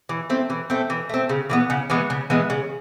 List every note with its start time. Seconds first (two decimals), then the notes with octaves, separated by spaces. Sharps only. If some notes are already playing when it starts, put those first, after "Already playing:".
0.09 E3
0.30 A3 C4
0.50 E3
0.70 A3 C4
0.90 E3
1.09 A3 C4
1.29 C#3
1.50 E3 G#3 B3
1.70 C#3
1.90 E3 G#3 B3
2.10 C#3
2.30 E3 G#3 B3
2.50 C#3